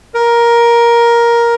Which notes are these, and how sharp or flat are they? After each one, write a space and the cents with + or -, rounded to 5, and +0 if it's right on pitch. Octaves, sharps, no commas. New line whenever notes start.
A#4 +10